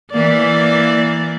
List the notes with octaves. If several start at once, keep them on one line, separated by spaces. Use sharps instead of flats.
E3 A#3 D5